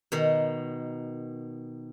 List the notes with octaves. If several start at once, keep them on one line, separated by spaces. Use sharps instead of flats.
B2 D#3